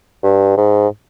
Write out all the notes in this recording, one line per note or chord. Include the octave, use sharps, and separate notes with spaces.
G2
G#2